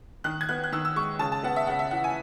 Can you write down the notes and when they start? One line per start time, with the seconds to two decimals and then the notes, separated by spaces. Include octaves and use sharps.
0.24 D#3 F#6
0.41 G#6
0.49 B3 F#6
0.64 F#6
0.72 D#3 E6
0.85 E6
0.96 G#3 C#6
1.19 C#3 A5
1.32 A5
1.43 B3 F#5
1.56 E5
1.67 C#3 F#5
1.79 E5
1.91 E3 F#5
2.04 G#5